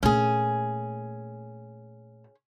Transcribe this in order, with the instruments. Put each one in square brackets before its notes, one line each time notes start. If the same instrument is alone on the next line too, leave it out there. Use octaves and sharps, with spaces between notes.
[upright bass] A#2 A3 [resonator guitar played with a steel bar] C#4 G#4